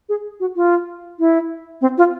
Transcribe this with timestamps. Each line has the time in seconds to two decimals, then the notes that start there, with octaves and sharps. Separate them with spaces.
0.09 G#4
0.40 F#4
0.56 F4
1.19 E4
1.81 C4
1.98 F4